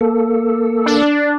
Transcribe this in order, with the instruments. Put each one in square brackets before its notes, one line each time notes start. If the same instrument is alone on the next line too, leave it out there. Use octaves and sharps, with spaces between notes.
[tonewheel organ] A#3 A4
[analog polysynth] D4